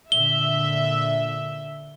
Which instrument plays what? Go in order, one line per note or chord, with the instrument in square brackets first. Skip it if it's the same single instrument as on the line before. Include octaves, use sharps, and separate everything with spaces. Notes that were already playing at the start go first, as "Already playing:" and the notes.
[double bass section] A#2 D3 [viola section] E5 [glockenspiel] G7